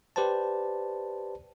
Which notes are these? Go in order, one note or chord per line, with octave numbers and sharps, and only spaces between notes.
G4 B4 C5 D5 A5